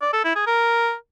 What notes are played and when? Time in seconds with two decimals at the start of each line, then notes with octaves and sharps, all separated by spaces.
0.02 D5
0.13 A4
0.24 E4
0.36 G#4
0.47 A#4